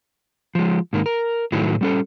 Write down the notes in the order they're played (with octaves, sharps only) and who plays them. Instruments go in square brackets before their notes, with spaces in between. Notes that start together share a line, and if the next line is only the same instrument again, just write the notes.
[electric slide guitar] F3 G#3
G#2 D#3 A#3
A#4
A2 D#3 F#3 A3 E4
G3 C#4 A4